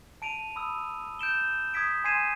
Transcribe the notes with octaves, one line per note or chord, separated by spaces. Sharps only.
A5 D7 D#7 F7
B5 D#6 E6
G6 D7 E7 G7
D#6 G#6 B6 D7
G#5 C6 G#6 C7 D#7 E7